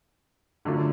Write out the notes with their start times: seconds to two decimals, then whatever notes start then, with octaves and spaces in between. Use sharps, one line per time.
0.65 D3 F#3 A3 D4 F4